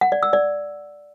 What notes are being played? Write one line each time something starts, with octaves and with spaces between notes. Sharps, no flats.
F#5
D5
E6
D5